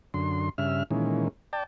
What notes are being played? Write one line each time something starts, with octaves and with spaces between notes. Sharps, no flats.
F#2 D3 C6
G2 C#3 E5 F6
A#2 D#3 E3 G#3 C#4
D5 G5 A5